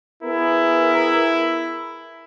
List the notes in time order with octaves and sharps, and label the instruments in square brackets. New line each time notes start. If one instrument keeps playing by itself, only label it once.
[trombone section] B3 G#4 A#4 [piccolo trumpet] E4